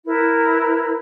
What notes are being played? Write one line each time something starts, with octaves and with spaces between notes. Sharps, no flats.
E4 A#4 B4